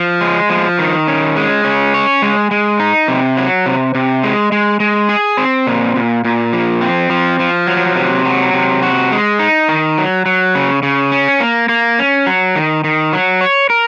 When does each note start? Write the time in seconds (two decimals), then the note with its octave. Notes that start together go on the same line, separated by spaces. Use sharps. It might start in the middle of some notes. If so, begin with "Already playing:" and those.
Already playing: F3
0.21 G#3
0.50 F3
0.79 D#3
1.07 C#4
1.36 G#3
1.64 C#4
1.94 C#5
2.22 G#3
2.51 G#3
2.79 D#4
3.08 C3
3.37 F#3
3.66 C3
3.95 C3
4.23 G#3
4.52 G#3
4.80 G#3
5.09 G#4
5.37 C4
5.67 A#2
5.96 A#2
6.25 A#2
6.53 F3
6.81 C4
7.10 F3
7.39 F3
7.67 F#3
7.96 C3
8.25 F#3
8.53 C3
8.83 F#4
9.12 G#3
9.39 D#4
9.68 D#3
9.98 F#3
10.26 F#3
10.55 C#3
10.83 C#3
11.12 C#4
11.40 A#3
11.69 A#3
11.99 C#4
12.27 F#3
12.56 D#3
12.84 D#3
13.13 F#3
13.41 C#5
13.70 A#4